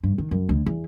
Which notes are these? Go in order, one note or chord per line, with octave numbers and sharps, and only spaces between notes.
G2
D#3
F#2
D2
E2